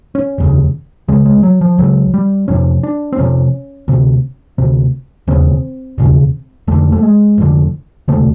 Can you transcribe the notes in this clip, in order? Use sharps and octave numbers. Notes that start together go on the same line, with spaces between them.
C#4
F1 D#2 C#3
C#2 C#3 G#3
G#3
F#3
F3
C#2 C#3 F#3
G3
F1 F2 C3 C#4
D4
C4
F1 F2 C3 C#4
D2 C3
D2 C3
E1 D#2 C#3 C4
E1 D#2 C#3
F1 F2 D3 A3
A3
G#3
F1 F2 D3
E1 D2 C3 A3